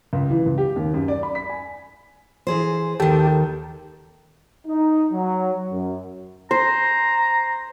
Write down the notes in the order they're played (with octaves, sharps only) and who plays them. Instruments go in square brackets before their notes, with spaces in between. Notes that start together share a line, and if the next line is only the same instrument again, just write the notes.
[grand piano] C#2
E3
C#2
G4
D#2
F#2
D5
B5
B6
G#5
[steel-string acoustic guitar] E3 G#4 C5
[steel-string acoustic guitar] D#2 D#3 [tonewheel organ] G4 A4
[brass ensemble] D#4
F#3
F#2
[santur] C5 [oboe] A#5